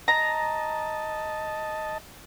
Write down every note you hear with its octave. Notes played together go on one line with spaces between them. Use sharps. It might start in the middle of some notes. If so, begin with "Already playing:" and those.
D#5 A5 A#5